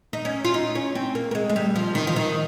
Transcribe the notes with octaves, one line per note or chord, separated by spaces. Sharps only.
D#4
C#4
F4
D#4
C#4
C4
A#3
A#3
G#3
G#3
G3
F3
D#3
F3
D#3